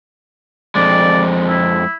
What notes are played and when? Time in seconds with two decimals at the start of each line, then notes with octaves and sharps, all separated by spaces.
0.75 F2 G#3 D5
1.48 E4